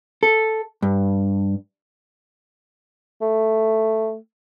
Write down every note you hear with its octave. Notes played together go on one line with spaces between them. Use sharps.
A4
G2
A3